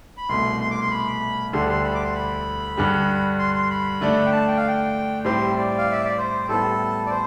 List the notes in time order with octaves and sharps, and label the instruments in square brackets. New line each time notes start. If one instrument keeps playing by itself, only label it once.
[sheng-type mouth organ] B5
[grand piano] C2 B2 A3 [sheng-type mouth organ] C6
[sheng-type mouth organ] C6
D6
C6
B5
[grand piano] D2 D3 G3 D4 A4 [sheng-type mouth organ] C6
[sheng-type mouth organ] C6
B5
D6
C6
B5
[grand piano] G2 D3 G3
[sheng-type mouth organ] C6
C6
B5
[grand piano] D3 A3 D4
[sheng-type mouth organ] G5
A5
G5
F5
G5
[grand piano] A2 G3 C4 G4 [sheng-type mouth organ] C6
[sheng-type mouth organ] D5
F5
E5
D5
C5
[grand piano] A2 G3 B3 [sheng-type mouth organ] A4
[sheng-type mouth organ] D5
C5